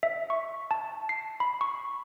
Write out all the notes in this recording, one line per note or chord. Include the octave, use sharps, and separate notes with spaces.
E5
C#6
A5
C7
B5
C#6